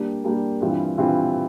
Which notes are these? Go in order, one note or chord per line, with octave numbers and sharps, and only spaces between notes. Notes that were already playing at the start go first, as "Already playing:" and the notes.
Already playing: G3 A#3 D4 G4
G3 A#3 D4 G4
G2 E3 G3 C4 F4
G2 E3 G3 C4 F4